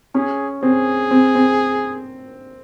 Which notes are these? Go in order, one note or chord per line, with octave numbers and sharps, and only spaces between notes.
C#4 G#4
C4 G#4
C4
C4